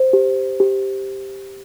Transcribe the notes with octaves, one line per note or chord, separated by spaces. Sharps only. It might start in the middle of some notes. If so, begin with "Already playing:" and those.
Already playing: C5
G4
G4